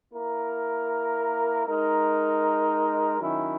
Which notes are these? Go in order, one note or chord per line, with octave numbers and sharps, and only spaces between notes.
A#3 E4 A#4
G#3 D#4 A#4
D#3 F#3 C#4 E4